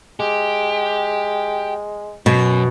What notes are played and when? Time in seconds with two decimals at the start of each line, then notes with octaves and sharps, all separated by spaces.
0.20 G#3 G4
2.26 F#2 B2